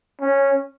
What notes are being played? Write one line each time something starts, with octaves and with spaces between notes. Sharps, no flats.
C#4